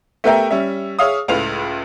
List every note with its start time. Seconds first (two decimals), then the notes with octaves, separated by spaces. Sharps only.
0.24 A3 B3 G4 A#4 E5 G5
0.51 G3 C#4 E5
0.99 G#4 C#5 E5 F5 D#6
1.28 C#2 A2 B4 F5 F7